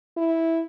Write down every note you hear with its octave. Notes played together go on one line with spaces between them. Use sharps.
E4